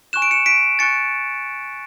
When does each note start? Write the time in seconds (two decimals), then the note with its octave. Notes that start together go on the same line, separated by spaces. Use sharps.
0.13 G#5 C#6 F#6 E7
0.22 D7
0.31 C#7 E7
0.46 B6 D7
0.79 G#5 C#6 F#6 A6 C#7